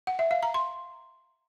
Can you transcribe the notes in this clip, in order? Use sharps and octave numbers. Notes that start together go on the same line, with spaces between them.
F#5
E5
F5
A#5
C6